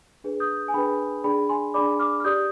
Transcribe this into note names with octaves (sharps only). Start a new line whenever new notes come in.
D4 G#4 B4
D#6 G6
G#5
D4 G#4 B4 G5 B5
D4 G#4 D5 G5 B5
G#5 C6
D4 G#4 D5 B5 D6
D6 F6
F6
G4 D5 D#6 G6